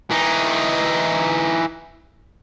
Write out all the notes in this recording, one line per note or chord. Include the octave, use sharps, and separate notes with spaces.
E3 D#4